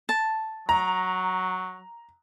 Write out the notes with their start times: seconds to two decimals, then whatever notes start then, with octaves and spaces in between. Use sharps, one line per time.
0.09 A5
0.69 F#3 A#5